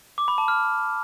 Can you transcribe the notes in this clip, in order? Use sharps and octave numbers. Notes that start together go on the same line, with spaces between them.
D6
B5
A5
F6